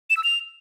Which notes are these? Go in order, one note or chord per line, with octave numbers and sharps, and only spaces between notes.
E7
E6
F7